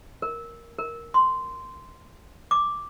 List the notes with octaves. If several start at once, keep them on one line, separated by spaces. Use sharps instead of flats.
A#4
A#4
C6
D6